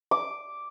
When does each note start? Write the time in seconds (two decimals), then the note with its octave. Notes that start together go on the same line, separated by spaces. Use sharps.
0.11 D6